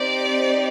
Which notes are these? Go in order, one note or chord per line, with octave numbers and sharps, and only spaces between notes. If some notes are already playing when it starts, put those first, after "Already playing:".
Already playing: C4 D#4 G4 D5